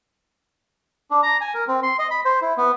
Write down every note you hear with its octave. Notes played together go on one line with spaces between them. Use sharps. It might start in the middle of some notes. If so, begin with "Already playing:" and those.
D4
A#5
G#5
A#4
C4
C6
D#5
B5
C5
E4
B3